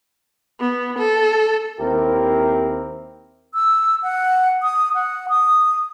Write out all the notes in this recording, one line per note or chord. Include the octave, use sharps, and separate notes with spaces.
B3
A4
D#2 C4 E4 G4 A#4
E6
F#5
D#6
F#5
D#6